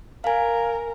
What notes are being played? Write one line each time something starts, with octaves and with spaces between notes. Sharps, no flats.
A#4 F5 G#5